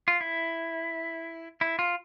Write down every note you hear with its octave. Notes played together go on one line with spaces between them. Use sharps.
F4
E4
E4
F4